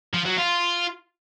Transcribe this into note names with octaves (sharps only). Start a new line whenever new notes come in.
F3
F#3
F4